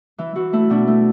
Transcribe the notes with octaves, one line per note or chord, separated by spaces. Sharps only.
E3 E4
E3 F#4
A3 E4
B2 D4
A3